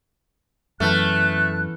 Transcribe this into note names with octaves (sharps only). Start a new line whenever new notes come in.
F#2 E3 A3 B3 F6 F#6